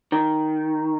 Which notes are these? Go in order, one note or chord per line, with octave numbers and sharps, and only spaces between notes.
D#3